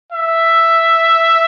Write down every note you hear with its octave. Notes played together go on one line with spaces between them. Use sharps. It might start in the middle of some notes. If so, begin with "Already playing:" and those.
E5